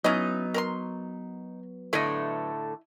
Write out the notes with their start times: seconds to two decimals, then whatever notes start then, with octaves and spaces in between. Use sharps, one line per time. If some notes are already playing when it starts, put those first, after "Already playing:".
0.04 F#3 B3 C#4 D#4 E4 D#5
0.54 A#4 A#5 C6
1.93 A2 D3 A3 E4 D#5